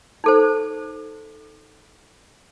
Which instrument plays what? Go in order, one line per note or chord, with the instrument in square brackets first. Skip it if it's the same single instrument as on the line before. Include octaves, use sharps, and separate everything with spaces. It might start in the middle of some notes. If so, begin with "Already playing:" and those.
[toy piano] D#4 A4 C5